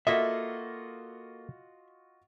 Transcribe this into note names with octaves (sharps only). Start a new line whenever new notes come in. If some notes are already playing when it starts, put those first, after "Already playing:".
A#3 F4 F#4 A4 D#5 E5